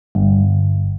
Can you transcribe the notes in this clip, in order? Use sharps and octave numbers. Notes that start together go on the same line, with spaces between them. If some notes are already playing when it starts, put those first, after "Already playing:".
G1